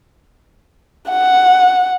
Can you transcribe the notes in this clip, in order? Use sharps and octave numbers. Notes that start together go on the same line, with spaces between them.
F#5